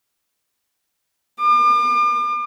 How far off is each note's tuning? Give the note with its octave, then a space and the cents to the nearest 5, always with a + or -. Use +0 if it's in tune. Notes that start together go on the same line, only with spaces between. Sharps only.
D6 +40